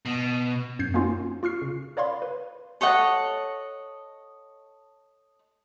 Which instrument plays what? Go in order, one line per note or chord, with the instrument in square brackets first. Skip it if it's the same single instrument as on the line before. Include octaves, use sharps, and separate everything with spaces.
[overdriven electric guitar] B2
[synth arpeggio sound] F#2 G6 G#6 C7
A#3 C4 C#4 D#4 F4 F#4
F4 C#6 F6 C7
C#3
A#4 C#5 D5 F5 B5 C6
B4
[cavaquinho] A4 C#5 D#5 F#5